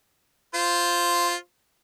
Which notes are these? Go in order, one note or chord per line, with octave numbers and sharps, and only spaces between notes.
F4 C5